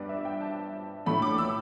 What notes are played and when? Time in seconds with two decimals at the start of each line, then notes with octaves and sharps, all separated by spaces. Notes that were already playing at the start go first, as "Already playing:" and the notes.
Already playing: G2 G3 B3 D4 B4 D5
0.09 E5
0.25 G5
0.41 A5
1.06 A2 A3 D4 B5
1.22 D6
1.38 E6